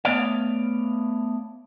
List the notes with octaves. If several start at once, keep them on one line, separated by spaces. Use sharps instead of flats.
A3 B3 C#5 D5 F5